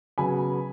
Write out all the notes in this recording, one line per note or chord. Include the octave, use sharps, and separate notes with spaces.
C#3 F#3 B3 G#5 B5